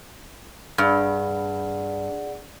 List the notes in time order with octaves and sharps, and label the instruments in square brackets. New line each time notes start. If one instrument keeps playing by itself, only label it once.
[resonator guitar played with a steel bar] G2 [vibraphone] G#4 D5 F#5